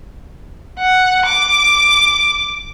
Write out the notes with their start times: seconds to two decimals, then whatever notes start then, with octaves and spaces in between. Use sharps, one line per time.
0.79 F#5
1.26 D6